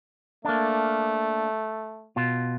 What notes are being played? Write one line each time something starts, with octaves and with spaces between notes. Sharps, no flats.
A3 A#3 D4
B2 F4